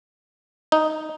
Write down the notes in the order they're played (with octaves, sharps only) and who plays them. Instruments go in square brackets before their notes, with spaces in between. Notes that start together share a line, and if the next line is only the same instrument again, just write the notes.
[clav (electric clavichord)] D#4